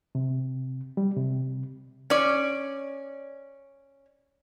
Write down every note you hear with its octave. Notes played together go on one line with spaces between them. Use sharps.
C3
G3
C3
C#4 D5